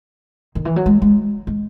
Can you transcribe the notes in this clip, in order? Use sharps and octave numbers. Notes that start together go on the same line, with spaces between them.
D#3
E3
F#3
G#3
G#3
G#3